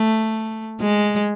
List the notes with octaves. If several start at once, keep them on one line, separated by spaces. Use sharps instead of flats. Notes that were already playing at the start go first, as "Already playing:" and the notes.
Already playing: A3
G#3